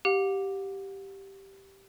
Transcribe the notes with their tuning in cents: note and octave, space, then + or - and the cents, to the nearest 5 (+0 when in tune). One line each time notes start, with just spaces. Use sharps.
G4 -10 F#5 -45